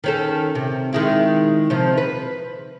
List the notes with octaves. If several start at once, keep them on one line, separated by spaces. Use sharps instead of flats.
D#3 C#4 A4
C3
D#3 G#3 E4
C3 D#3 F3
B4